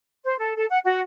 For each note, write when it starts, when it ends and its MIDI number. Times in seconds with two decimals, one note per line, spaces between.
0.24 0.36 72
0.38 0.56 69
0.56 0.65 69
0.69 0.78 78
0.84 1.00 66